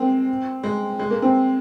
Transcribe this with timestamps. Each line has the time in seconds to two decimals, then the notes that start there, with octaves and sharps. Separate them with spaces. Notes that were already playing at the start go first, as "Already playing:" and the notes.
Already playing: G#3 A#3 C4
0.63 G#3
0.99 G#3
1.10 A#3
1.22 C4